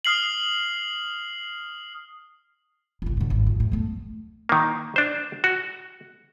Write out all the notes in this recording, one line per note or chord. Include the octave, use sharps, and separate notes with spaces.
D#6 F6 C7 F#7
G1 C2
A2 D3
G#1
F2
A2
A3 B3
D#3 A#3
D4 C5
F#4